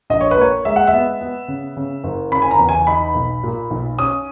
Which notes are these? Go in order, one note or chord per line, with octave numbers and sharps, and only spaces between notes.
A#1 D#5
C#5
B4
A#3 C#5
G#3 E5
F#5
E5
B3
B3
C#3
C#3
F#1
C#3 B5
G#5
A#5
E2
G#5
D#4 B5
B1
A#2
B1
C#4 D#6